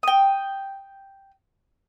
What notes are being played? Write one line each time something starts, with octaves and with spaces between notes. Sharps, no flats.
G5 D#6